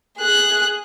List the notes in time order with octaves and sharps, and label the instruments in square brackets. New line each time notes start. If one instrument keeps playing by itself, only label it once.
[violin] G#4 F#6